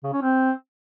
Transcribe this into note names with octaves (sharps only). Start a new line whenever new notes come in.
C#3
C#4
C4